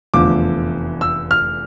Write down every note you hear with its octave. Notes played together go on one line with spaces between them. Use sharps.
F1 E2 D3 F3 D6
E6
F6